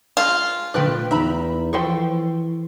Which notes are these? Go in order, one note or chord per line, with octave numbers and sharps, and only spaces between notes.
G#3 F4
A#2 D3 F3 A3 B4 G5 F#6
E2 D#4 E5 A#5 B5
E3 F3 E4 A4 G5 C6 C#6